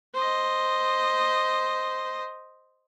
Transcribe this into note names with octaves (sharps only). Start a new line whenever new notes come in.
C5 D#5